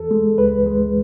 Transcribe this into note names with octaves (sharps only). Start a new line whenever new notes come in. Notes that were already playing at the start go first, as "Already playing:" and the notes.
Already playing: E2 A4
G#3
C#2 B4
G#3